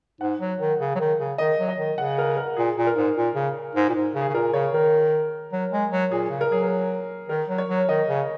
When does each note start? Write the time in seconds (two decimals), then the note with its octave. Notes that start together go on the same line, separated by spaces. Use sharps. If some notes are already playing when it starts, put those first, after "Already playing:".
0.21 G#2 F#5
0.40 F#3
0.60 D#3
0.80 C#3
0.95 F#3
1.00 D#3
1.19 C#3
1.38 D#3 D#5
1.59 F#3
1.69 D#5
1.78 D#3
1.98 C#3 F#5
2.18 A#4
2.37 A#4
2.56 A#2 G#4
2.77 A#2
2.87 A#4
2.96 G#2
3.16 A#2
3.35 C#3
3.75 G#2
3.89 A#2
3.95 G#2
4.14 C#3
4.21 G#4
4.29 C#3
4.34 A#2 A#4
4.53 C#3 C#5
4.73 D#3 A#4
5.52 F#3
5.72 G#3
5.91 F#3
6.11 A#2 G#4
6.30 C#3
6.41 A#4
6.51 F#3 G#4
6.63 A#4
7.29 D#3 A#4
7.49 F#3
7.58 C#5
7.69 F#3
7.88 D#3 D#5
8.08 C#3